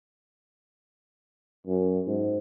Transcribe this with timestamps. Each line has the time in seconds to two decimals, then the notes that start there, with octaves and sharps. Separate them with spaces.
1.67 F#2
2.07 G#2